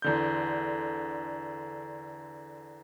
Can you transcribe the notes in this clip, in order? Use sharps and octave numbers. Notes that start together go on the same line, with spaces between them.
E2 D3 G6